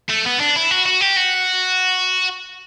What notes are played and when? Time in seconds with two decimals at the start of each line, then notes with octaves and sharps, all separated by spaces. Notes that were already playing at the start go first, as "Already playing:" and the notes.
0.09 A3
0.25 B3
0.40 D4
0.56 E4
0.71 F#4
0.86 F#4
1.01 G4
1.17 F#4